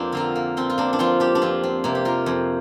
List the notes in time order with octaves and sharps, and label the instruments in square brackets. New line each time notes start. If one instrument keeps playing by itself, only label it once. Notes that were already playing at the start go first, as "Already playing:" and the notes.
Already playing: [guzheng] F2 A#3 C4 D4
D3 F4 A#4
A#3
F3 C4
F4
A#3 D4
D4
F3 C4 F4
D4 G4
D4
F2 C4 F4
C4
C3 A#3
G4
F4 A#4
F2